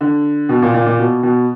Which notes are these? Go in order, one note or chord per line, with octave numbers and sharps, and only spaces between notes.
D3
B2
A#2
A#2
A#2
B2
B2